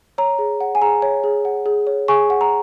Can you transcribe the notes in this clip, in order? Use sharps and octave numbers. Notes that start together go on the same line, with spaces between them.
C#5 A#5
G#4
F#5
G#5
G#4 A#5
C#5
G#4
F#5
G#4
C#5
G#4 G#5 C#6
F#5
A#5